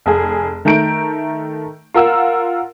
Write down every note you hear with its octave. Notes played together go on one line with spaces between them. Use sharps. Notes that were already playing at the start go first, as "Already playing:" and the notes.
F1 G#4
D#3 A3 A#5 G6 D7
F4 A#4 F#5 E6